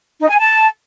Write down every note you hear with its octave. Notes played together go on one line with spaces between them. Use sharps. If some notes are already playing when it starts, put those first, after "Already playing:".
D#4
G#5
A5